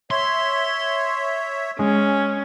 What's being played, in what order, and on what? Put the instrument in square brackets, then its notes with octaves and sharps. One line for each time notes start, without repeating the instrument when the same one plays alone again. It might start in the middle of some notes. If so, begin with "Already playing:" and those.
[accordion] C#5 E5 [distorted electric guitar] C6
[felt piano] G#3 [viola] C#4